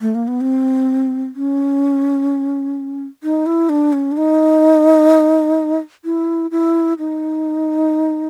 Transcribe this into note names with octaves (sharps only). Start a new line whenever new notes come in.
A3
A#3
B3
C4
C#4
D#4
E4
D4
C#4
D4
D#4
E4
E4
D#4